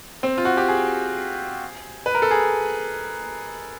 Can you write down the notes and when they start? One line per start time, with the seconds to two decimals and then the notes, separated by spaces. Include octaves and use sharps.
0.23 C4
0.38 F4
0.45 F#4
0.57 G4
0.68 G#4
2.06 B4
2.15 A#4
2.22 A4
2.31 G#4